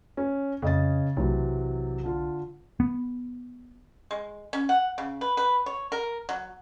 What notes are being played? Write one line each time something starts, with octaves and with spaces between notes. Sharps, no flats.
C#4
F2 C#3 D#5 A6
B1 C3 E3 F#3
D3 F4
B3
G#3
C#4
F#5
C#3
B4
B4
C#5
A#4
F#3